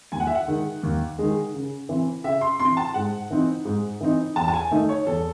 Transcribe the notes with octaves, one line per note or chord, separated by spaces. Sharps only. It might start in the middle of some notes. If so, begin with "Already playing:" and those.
D#2 G#5
F#5
E5
F#5
D#3 G#3
D#2
D#3 G#3
C#3
E3 C4
C#3 E5
C6
E3 C4 C6
A5
G#2 F#5
E3 C4 D#4
G#2
E3 C4 D#4
E2 A5
A5
G#5
D#3 A3 D#4
C#5
E2 A4